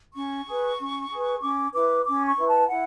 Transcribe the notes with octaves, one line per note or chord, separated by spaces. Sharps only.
C#4 C#6
G#4 B4
C#4
G#4 B4
C#4 D6
E4 B4 D6
C#4 D6
C#6
E4 B4
A5
E4 F#5